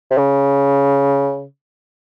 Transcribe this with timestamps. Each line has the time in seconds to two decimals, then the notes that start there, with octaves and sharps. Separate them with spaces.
0.11 C3
0.18 C#3